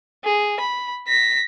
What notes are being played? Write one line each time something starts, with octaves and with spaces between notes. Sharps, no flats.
G#4
B5
A#6 B6